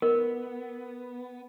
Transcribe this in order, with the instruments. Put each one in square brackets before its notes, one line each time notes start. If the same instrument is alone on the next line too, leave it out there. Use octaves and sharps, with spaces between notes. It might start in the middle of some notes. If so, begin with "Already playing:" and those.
[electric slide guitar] B3 [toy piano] A#4